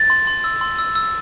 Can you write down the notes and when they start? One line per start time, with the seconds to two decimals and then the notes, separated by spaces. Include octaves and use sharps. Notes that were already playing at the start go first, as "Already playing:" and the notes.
Already playing: A6
0.10 C6
0.27 C6
0.44 E6
0.61 C6
0.78 E6
0.95 E6